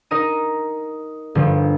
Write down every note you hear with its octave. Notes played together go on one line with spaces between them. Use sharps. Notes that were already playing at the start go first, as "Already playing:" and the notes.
D#4 A#4 D#5 D#7
G1 F3